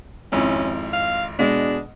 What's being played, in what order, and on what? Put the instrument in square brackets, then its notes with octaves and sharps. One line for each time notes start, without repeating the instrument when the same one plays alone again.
[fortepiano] G#1 F2 E4 [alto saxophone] C#4
[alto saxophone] F5
[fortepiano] B2 G#3 [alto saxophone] D4